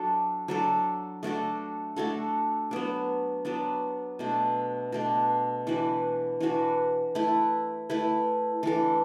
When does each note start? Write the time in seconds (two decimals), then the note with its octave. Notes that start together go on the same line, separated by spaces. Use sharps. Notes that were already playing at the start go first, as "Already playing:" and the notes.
Already playing: F#3 D4 A4
0.48 F#3 D4 A4
1.23 A3 D4 F#4 A4
1.96 A3 D4 F#4 A4
2.71 F#3 B3 D4
3.45 F#3 B3 D4
4.19 B2 A3 D4
4.92 B2 A3 D4
5.67 E3 D4 F#4 B4
6.41 E3 D4 F#4 B4
7.15 A3 E4 B4
7.90 A3 E4 B4
8.63 E3 D4 A4